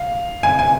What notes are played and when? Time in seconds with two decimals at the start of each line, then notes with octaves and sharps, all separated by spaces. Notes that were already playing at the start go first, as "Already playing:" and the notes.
Already playing: F5
0.43 G#5
0.59 G#5